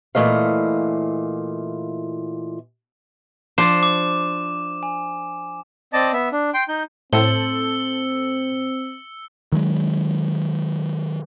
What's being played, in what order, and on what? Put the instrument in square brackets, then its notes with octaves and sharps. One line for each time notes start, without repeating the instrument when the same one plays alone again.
[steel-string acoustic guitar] A#2 E3 A3 D#5 F5
[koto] F3 D4 C5 [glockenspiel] E7
[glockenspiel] D6
G#5
[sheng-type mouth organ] C4 D5 D#5 A5
B3 E5
D4
G5 C6
D#4 G6
[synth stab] A2 [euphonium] C4 [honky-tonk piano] A4 C5 [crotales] E6 C#7 G7
[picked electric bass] D#3 F#3 G#3